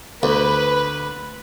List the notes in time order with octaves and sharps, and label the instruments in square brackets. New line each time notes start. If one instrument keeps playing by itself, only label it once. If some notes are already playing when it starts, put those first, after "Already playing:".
[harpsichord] D2 [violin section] B4